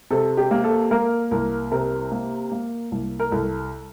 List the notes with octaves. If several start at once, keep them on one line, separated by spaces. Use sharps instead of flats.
C3 A4
G4
A#3
A4
A#3 A#4
C2 A#4
C3 A#4
A#3
A#3
C2
A#4
C2 A4